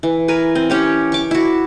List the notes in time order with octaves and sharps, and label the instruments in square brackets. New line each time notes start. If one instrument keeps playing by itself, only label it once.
[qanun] E3
A#4 B4 G#5
C4
C#4 G4 C#5
C#6 D6
E4 F#4